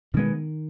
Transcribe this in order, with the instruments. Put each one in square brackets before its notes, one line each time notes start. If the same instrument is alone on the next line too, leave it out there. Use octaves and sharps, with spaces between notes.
[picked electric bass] B2 G#3 B3 [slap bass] D#3